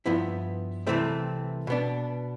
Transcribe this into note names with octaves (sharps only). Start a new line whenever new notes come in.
G2 F3 B3 E4
C2 C3 E3 A3 C4
B2 B3 D4